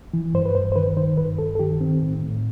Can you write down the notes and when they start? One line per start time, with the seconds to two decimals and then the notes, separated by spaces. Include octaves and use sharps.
0.14 E3
0.34 G2 C5
0.46 B4
0.55 G2 C5
0.72 C5
0.76 D#3 B4
0.97 D#3 C5
1.17 G2 B4
1.38 G2 A4
1.55 A4
1.59 D#3 G4
1.81 D#3 C4
2.02 A2
2.23 A2